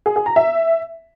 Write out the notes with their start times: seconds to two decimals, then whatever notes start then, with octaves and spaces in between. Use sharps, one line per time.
0.06 G#4
0.16 G#4
0.26 A#5
0.36 E5